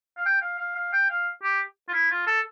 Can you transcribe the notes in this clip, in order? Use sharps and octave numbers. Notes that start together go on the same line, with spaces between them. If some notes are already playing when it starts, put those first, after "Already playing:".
F5
G5
F5
F5
F5
G5
F5
G4
F4
E4
F4
A4